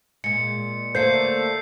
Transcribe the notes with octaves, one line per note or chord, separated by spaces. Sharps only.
A#2 G#3 C#7
D3 A3 A#3 C5 G6 C7